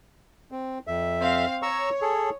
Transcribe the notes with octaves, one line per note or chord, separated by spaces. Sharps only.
C4
F2 E5
C4 F5
C#5 A#5 C#6 E6
G#4 A4